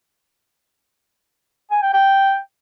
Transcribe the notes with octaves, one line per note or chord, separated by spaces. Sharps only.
G#5
G5
G5